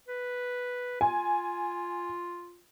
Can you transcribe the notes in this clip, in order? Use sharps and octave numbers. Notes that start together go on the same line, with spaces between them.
B4
F4 G#5